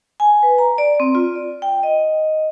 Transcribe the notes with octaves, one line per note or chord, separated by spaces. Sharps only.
G#5
B4
A#5
D5
C4
F4
D5
G5
D#5